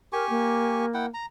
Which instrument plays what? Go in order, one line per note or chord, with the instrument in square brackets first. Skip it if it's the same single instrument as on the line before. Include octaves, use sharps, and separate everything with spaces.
[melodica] G4 G#5 C#6 [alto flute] A#4
[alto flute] A#3
[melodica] E4 F#5 G5
A#5